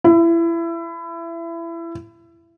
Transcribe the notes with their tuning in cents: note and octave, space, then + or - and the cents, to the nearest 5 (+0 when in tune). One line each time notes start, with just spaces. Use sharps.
E4 +25